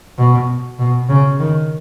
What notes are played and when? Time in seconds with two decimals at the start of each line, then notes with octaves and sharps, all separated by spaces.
0.18 B2
0.79 B2
1.09 C#3
1.39 D#3